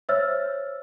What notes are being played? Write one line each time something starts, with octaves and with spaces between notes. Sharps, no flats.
C5 C#5 E5 E6 F6 A6